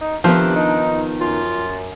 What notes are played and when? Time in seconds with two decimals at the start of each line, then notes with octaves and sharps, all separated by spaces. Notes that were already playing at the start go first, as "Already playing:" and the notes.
0.01 D#4
0.24 C3 D#3 F3 B3 C4 D4
0.56 D#4
1.21 F#2 F4